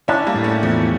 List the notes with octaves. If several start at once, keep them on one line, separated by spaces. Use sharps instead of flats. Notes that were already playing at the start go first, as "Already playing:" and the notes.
C#4 D4 E4
G3 A#3
A2
A3 C#4
E2 F3 A3